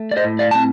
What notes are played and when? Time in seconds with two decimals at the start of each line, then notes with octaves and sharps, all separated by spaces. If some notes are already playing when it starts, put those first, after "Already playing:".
Already playing: A3
0.11 D5
0.17 C5 D#5
0.24 A2
0.39 D5 F5
0.51 C4 A5